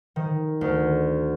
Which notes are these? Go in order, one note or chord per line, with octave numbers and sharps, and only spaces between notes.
D#3
D2